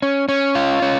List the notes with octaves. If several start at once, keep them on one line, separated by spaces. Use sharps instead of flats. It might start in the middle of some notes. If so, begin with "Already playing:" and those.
C#4
C#4
F4
C#4